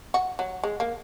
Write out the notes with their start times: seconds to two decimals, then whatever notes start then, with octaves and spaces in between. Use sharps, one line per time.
0.14 F#4
0.39 F#3
0.63 G#3
0.80 A#3